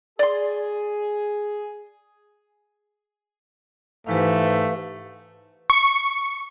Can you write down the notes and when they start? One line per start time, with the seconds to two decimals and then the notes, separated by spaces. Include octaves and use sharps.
0.19 G#4 D5 C6
4.07 G#2 E3 A3 G4 B4 F5
5.70 C#6